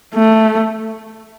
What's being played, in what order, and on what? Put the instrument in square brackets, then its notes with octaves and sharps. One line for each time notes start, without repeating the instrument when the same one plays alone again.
[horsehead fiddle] A3